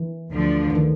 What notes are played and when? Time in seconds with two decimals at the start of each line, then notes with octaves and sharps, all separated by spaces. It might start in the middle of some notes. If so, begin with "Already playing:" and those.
Already playing: E3
0.30 D2 D3 F3
0.70 E3
0.75 D#3